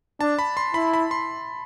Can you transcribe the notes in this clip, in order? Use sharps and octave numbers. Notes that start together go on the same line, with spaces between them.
D4 A5
B5
C6
E4 B5
B5
C6